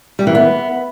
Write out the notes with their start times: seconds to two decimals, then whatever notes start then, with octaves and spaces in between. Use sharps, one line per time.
0.19 G3
0.27 E3
0.35 B3